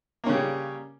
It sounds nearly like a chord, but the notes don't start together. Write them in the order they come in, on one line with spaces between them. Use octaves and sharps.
A#3 C#4 C#3 G3